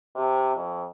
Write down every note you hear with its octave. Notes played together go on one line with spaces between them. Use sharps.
C3
F2